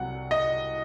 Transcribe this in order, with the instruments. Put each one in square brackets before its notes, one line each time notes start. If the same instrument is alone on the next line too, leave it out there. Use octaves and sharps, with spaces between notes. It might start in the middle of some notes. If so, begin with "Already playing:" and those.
Already playing: [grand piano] C2 C3 F#3 F#5
D#5